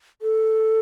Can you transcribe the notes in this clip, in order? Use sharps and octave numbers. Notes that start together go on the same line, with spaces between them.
A4